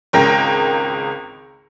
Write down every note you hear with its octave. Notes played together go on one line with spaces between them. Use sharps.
G#1 C#2 A#4 G5 A#6